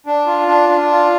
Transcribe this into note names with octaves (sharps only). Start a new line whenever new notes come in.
D4
F4
D4
D4
F4